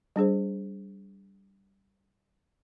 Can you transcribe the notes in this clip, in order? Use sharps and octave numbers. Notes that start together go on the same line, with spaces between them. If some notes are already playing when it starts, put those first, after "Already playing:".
G3 D4 G#4 C5